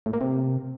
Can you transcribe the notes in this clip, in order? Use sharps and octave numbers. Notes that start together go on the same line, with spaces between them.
A2
A#3
C3